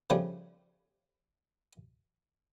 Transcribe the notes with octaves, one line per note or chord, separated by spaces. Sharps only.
C#3 F3 G3 A3 D4